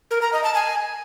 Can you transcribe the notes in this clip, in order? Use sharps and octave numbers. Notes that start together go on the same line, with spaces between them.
A#4
A#5
D#5
A5
G#5